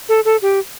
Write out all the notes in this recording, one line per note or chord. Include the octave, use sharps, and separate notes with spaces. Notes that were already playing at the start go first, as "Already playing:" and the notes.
A4
A4
G4